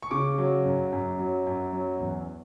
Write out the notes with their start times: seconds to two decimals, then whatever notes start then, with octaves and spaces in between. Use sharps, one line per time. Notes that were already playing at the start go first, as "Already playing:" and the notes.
0.03 C#6
0.11 C#3 D6
0.38 F#3
0.65 F#2
0.92 F#2
1.19 F#3
1.47 F#2
1.73 F#3
2.00 E2